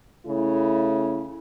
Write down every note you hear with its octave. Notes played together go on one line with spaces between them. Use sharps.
C#3 A3 E4